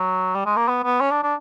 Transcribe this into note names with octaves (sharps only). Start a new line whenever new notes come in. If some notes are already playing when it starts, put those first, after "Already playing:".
Already playing: F#3
G3
G#3
A#3
B3
B3
C#4
D4
D4